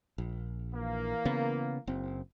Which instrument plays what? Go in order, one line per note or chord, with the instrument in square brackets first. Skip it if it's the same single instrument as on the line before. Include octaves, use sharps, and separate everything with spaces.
[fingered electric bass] A#1
[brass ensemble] E3 A#3
[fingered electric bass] C#3 B3
F#1 C4